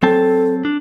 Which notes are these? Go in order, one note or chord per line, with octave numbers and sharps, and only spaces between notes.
F#3 C4 A4 A5
D4